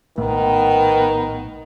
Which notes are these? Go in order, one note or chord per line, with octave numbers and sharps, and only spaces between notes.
A#1 A2 D#3 A3 B3